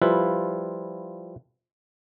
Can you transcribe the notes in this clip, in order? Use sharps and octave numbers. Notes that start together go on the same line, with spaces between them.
F3 G3 E4 F4 B4